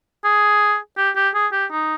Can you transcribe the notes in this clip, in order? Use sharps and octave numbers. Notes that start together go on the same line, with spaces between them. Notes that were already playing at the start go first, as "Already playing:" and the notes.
G#4
G4
G4
G#4
G4
D#4